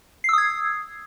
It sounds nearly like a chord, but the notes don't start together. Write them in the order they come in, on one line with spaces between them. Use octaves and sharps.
C7 E6 D#6 G#6